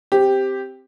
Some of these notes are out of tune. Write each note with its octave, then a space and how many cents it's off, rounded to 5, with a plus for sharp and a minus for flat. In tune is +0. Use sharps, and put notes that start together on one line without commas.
C4 +0 G4 +0